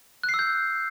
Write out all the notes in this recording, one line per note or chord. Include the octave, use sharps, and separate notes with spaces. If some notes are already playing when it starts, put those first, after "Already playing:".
F#6
C7
E6
G6